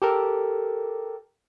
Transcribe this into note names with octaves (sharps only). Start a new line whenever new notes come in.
G4 A4 A#4